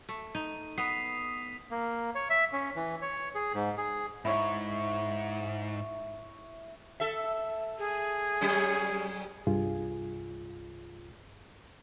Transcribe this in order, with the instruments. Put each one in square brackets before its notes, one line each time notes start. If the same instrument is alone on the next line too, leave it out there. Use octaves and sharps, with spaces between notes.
[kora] A3
[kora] D#4 [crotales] D#7
[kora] B3 [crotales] D#6 B6 C7
[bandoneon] A#3
C#5
E5
C#4
E3
C#5
G#4
G#2
G#4
[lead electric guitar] G#2 [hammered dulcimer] E4 C#5
[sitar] A4 E5
[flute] G#4
[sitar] F#3 G3 C#4
[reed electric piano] C2 G2 F4 G#4